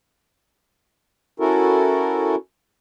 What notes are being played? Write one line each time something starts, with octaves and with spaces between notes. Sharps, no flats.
C#4 E4 F#4 A4 A#4